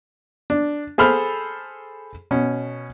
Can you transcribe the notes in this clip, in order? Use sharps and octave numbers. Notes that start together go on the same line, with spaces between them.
D4
G#4 A4 C5 B5 F6
B2 C#4